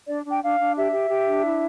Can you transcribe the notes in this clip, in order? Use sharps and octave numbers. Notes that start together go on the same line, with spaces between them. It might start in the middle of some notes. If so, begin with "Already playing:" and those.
D4 D5
D4
G5
D4 F5
D4
G4 E5
G4
G4
D4
E4